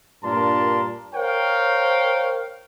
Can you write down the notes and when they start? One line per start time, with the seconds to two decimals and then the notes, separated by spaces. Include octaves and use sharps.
0.23 G2 A#2 D4 A#4 A5 C6
1.15 A#4 C5 C#5 F5 G5